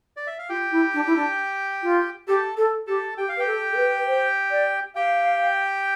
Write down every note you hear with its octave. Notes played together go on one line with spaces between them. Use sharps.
D5
E5
F5
F4 G4 G5
E4
D4
E4
D4
F4
G4 A4 A5
A4
G4 A4 A5
G4 G5
F5
G4 B4 G5
A4
A4
B4
B4
C5
D5
G4 F5 G5